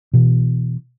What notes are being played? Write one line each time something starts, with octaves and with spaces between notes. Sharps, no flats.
B2 E3